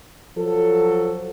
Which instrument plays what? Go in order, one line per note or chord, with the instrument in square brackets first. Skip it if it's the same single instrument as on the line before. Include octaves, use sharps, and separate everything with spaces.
[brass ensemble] F3 F#3 A4